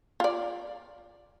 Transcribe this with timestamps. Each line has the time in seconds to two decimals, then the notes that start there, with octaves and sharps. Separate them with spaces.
0.20 F4 D5